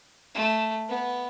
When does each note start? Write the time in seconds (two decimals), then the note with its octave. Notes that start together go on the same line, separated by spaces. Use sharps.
0.35 A3
0.88 B3